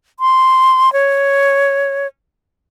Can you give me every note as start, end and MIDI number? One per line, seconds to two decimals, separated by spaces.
0.20 0.92 84
0.93 2.07 73